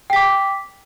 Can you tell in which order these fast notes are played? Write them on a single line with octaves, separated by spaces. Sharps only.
G5 B6 D6